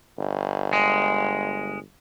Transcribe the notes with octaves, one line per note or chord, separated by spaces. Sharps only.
G1
G#3